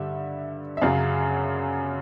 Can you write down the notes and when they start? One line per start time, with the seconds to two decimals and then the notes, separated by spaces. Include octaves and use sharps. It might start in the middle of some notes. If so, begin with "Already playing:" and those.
Already playing: G2 D3 G3 E5
0.77 E5
0.82 F#2 C#3 F#3 F5